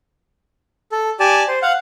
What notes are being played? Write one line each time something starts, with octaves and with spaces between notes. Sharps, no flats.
A4
G4 D5 G#5 A5
C5
F5 F#5